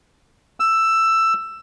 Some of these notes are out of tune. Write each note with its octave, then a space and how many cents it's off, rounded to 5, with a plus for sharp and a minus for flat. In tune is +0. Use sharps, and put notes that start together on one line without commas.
E6 +10